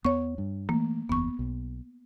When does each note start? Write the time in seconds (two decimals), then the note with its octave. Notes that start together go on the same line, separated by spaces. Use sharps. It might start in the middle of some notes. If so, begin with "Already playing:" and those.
0.05 E2 B3 C#5 C#6
0.38 G2
0.69 E3 A3 A#3
1.09 F#1 E2 B3 C#6
1.39 B1